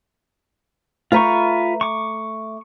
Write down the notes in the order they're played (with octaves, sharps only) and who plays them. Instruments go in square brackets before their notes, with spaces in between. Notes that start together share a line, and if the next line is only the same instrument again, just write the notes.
[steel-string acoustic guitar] A3 A#5 [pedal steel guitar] F4 B4 C#6
[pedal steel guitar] C#6 D6